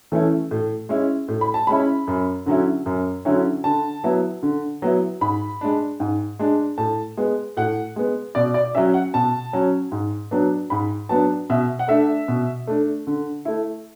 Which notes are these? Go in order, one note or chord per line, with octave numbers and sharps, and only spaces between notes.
E3 A3 C#4 E4
A2
G#3 C#4 E4
A2
B5
A5
G#3 C#4 E4 B5
F#2
D3 F#3 C#4 E4
F#2
D3 F#3 C#4 E4
D3 A5
F#3 B3 E4
D3
F#3 B3 E4
G#2 B5
G#3 D4
G#2
G#3 D4
A2 A5
G#3 B3
A2 F#5
G#3 B3
B2 D5
D5
F#3 C#4 E5
F#5
B2 A5
F#3 C#4
G#2
F#3 B3 D4
G#2 B5
F#3 B3 D4 A5
B2 E5
F#5
A3 D4 E5
B2
A3 D4
D3
A3 E4